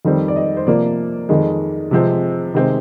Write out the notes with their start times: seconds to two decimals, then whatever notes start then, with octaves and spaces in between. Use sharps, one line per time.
0.05 F2 D#3 G3 C4 D5
0.28 D5
0.36 D#5
0.57 C5
0.67 C3 F3 A#3 D5
1.29 F2 D#3 G#3
1.91 C3 F3 G#3 C4
2.54 C3 D#3 G#3 C4